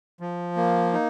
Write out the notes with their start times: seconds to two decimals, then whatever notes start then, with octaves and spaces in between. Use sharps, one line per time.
0.21 F3
0.56 A#3
0.93 D#4